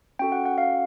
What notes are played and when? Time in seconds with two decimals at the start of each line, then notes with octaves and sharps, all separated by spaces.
0.19 C#4 F#4 A4 G5
0.32 F#5
0.46 F#5
0.58 F5